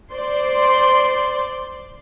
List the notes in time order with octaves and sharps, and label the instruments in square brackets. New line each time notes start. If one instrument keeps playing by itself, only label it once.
[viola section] C5 D5 C6